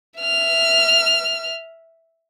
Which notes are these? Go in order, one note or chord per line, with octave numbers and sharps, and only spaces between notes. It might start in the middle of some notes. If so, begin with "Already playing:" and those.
E5 F6